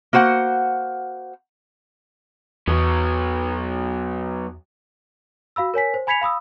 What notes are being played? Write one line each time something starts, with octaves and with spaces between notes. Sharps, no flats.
A#3 F#4 C5 F#5
E2 F#3 B3
F#4 F5 B5 E6
A#4 C#5 G#5 B6
C5
G#5 B5 G#6 B6 C#7 F7
F5 B5 D#6 E6